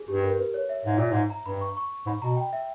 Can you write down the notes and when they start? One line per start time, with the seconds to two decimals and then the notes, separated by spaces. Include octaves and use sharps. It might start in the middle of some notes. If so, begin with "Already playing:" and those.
Already playing: G#4
0.08 G2 G4
0.23 A#4
0.39 B4
0.54 C#5
0.69 E5
0.84 G#2 E5
0.98 A#2 E5
1.12 G#2
1.30 A#5
1.45 G2 B5
1.61 C#6
1.77 C#6
2.06 G#2 B5
2.22 B2 A#5
2.37 G5
2.53 E5